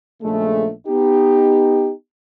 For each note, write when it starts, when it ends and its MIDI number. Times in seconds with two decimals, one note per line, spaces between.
0.22 0.69 34
0.22 0.69 49
0.22 0.69 56
0.22 0.69 57
0.88 1.91 59
0.88 1.91 63
0.88 1.91 67